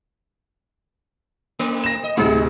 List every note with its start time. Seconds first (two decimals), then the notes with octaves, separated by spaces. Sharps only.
1.59 A3
1.84 A#6 E7
2.03 D#5
2.17 D2 A2 C3 D#4 G#4